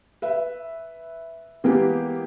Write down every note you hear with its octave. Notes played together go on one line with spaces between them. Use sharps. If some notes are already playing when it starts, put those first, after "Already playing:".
B4 E5
E3 G#3 A#3 B3 G4 G#4